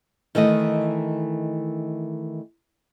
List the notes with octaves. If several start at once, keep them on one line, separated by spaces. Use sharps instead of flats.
D#3 E3 A3 D#5